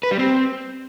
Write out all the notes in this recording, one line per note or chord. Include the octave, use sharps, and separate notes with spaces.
B4
G3
C4